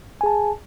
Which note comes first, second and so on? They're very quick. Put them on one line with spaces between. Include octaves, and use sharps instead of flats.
G#5 G#4 A5